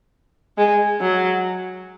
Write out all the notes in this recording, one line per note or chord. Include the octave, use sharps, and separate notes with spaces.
G#3
F#3